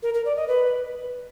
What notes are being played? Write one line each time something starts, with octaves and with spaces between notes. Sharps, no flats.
A#4
A#4
D5
D#5
B4